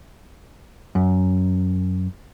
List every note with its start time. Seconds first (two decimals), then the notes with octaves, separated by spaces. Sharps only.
0.95 F#2